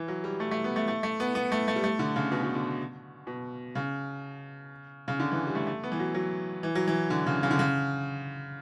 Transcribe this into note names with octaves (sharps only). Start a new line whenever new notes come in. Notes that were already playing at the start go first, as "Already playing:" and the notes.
Already playing: E3
F#3
G3
A3
A3
B3
A3
A3
A3
B3
B3
A3
A3
G3
A3
D3
C#3
B2
B2
D3
B2
C#3
C#3
D3
E3
G3
A3
A3
B3
E3
F#3
F#3
E3
F#3
E3
D3
C#3
C#3
D3
C#3